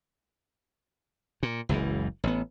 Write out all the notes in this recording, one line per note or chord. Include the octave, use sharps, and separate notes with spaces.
A#2
F#1 C#2 F#2 E3
A1 B3